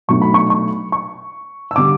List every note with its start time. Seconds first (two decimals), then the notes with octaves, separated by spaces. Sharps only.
0.08 B1 B2 F#3 A3 D4 C#6
0.22 B5
0.34 C#6
0.50 C#6
0.92 C#6
1.71 E6
1.76 D3 G3 D6